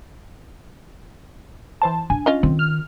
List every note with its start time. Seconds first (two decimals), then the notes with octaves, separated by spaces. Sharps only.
1.82 E3 C5 A5
2.10 D4 G#5
2.26 C#4 F4 D#5
2.43 D#3 C4
2.59 F6